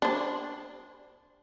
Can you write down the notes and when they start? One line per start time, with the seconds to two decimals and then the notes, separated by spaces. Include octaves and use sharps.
0.02 D4 C5